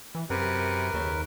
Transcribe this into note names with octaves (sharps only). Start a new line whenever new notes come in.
E3
F#2 C3 A#4 B4
D#2 C#3